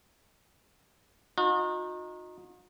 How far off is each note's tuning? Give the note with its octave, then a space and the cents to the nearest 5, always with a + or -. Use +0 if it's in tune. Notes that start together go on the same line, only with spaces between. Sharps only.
D#4 +0 F#4 -45